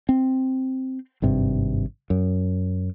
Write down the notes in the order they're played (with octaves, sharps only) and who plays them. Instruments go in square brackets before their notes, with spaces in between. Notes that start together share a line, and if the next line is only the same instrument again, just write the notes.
[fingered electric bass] C4
G#1 G2 C3
F#2